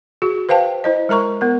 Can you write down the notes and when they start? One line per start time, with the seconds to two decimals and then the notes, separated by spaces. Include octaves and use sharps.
0.22 F#4 G#4
0.49 B4 C5 F5 G5 A5
0.84 E4 C5 D#5
1.09 G#3 A#4 A#5 C#6
1.41 B3 A#4